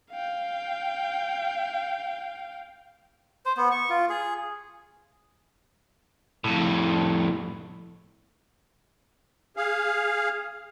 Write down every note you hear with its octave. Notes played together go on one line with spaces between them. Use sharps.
F5 G5
C5
B3
C#6
F4
G#4
F2 A2
G#4 F5